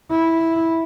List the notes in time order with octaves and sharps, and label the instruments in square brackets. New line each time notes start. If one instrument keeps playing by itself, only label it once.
[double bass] E4